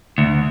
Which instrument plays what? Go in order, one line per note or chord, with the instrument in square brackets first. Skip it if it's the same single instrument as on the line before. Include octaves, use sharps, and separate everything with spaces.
[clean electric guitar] D2